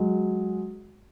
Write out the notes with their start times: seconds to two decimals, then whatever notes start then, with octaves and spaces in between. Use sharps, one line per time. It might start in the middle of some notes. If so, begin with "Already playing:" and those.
Already playing: F#3 G#3